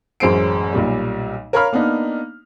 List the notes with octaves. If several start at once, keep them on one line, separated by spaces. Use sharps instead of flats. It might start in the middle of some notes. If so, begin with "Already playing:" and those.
A1 F#2 G#3 C5 C7 D7
B1 A#2 G3
A#4 C#5 F5 A#5 B5 F6
A#3 B3 D4 D#4